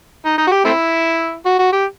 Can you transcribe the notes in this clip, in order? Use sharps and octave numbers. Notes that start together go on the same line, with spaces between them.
D#4
D#4
F#4
G4
A3 C4 E4
F#4
F#4
G4